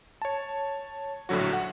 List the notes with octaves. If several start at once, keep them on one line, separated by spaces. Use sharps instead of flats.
C#5 A5
A#1 A2 D3 F#3 F#4
F#5